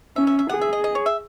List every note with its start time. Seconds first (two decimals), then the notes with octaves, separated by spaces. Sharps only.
0.16 C#4 E5
0.27 E5
0.39 E5
0.49 G#4 F#5
0.61 E5
0.73 D#5
0.84 D#5
0.95 C#5
1.06 E5